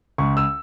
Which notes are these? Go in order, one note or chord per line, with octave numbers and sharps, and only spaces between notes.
C#2 C#6
E6